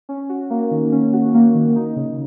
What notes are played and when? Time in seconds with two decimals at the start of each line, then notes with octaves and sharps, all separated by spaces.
0.09 C#4
0.29 F#4
0.50 A#3
0.71 D#3
0.92 C#4
1.13 F#4
1.34 A#3
1.55 D#3
1.76 D#4
1.96 C#3